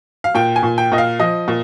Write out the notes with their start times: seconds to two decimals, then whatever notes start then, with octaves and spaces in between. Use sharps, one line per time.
0.24 F5
0.35 A#2 G5
0.56 G#5
0.63 A#2
0.78 G5
0.92 A#2 D#5
0.98 F5
1.19 F3 D#5
1.48 A#2